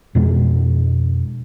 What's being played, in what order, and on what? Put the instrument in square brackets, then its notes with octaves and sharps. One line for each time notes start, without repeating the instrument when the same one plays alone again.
[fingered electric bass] F2 B2 G#3